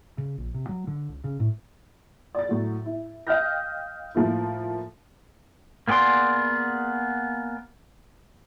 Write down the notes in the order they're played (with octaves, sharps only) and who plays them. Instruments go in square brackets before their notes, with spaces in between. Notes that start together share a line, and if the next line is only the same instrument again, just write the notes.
[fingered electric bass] C#3
A#1
C3
F#3
D3
C#2
C#3
A2
[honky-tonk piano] D5 A6
A2 F#3
E4
D#5 F5 G5 F6 G6 A#6
A2 F3 A#3 E4
[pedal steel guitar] A#3 B3 G#4 D5 C6